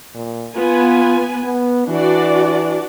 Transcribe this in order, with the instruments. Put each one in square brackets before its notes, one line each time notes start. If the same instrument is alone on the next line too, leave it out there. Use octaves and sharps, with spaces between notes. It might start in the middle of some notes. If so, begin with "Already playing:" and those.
[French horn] A#2
[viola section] B3 B4 G#5 [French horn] F4
[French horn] B3
[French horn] E3 [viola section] D4 F#4 D5